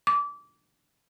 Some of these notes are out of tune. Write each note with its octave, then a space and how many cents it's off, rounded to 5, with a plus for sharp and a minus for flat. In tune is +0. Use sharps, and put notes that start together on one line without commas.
D6 -25